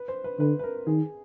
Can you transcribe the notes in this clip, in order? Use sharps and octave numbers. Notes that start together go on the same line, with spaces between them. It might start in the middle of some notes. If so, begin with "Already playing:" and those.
Already playing: B4
C5
B4
D3 B4
B4
A#4
D#3 G#4